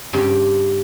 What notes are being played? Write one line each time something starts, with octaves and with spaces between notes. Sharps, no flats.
G2 C#3 G4 G5